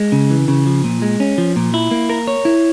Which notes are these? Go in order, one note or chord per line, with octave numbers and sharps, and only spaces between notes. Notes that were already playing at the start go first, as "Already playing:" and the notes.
Already playing: G#3
C#3
E3
C#3
F3
A#2
G#3
C#4
F3
A#2
E4
A#3
A#4
C#5
E4